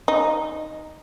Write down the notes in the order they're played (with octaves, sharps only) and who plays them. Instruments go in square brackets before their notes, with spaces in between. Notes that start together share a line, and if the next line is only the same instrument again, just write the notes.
[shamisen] D#4